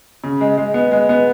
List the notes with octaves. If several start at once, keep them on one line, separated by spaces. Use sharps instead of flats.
C#3
G#3
G#3
B3
G#3
B3